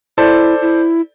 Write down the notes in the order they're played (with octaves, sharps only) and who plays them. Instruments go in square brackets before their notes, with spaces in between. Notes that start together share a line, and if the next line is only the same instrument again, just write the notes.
[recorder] E4 [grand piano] A4 C5 D5
[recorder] E4